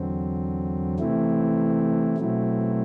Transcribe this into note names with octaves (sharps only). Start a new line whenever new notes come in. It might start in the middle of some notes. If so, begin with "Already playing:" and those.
Already playing: E2 D3 F#3 C4
C3 E3 A3 C4 E4
B2 F#3 A3 C4 E4